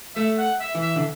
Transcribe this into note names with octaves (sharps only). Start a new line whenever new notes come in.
A3 E5
F#5
E5
E3
E5
D3